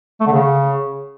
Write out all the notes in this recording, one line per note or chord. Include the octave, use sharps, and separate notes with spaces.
A3
D3
C#3